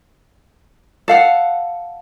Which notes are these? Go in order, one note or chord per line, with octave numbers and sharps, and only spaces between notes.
A4 F5 F#5